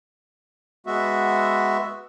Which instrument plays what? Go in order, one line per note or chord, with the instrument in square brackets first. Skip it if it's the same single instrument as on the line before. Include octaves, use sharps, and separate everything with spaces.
[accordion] G#3 B3 F#4 E5